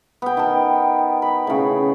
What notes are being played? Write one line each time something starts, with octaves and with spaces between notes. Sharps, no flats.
B3 G5
D#3 A5
B5
A2 C#3